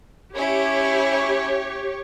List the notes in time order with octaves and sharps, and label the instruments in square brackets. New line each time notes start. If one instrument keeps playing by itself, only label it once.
[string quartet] C#4 E4 [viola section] G4 C#5